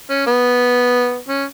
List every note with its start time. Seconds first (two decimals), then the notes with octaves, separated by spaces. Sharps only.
0.10 C#4
0.27 B3
1.28 C#4